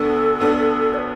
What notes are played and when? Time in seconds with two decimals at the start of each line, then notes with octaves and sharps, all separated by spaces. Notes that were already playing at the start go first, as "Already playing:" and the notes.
Already playing: D2 D3 B3 D4 A4
0.40 D2 D3 B3 D4
0.94 D5
0.98 B4